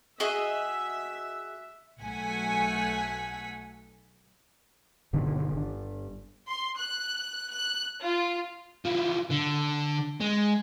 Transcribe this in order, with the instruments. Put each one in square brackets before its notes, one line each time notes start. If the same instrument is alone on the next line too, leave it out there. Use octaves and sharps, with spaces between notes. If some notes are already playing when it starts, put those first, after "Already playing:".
[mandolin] F#4 G#4 D#5 [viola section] E5
[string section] B1 A3 F#5 G#5 B6
[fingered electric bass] G1 B2 D3 D#3
G1 D4
[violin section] C6
F#6
F#6
F4
[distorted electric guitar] E3 F3
D3
G#3